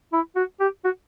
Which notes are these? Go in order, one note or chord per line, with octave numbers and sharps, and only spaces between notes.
E4
F#4
G4
F#4